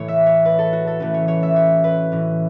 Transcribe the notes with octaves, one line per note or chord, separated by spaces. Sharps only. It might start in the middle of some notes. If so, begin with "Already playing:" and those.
Already playing: A2 E3 A3 C#5
E5
C#5
B4
A4
F#4
A4
E3 A3 C#4 B4
C#5
C#5
E5
C#5
B4
A2 E3 C#4